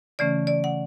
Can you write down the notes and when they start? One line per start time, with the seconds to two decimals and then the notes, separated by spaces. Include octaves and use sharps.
0.19 C#3 E3 A3 C#4 D5
0.47 D5
0.64 F#5